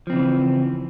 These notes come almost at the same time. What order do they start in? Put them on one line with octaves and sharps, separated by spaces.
F3 C4 C#3 E3